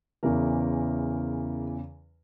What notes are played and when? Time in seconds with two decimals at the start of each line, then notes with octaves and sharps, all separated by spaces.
0.23 E2 C#3 E3 A#4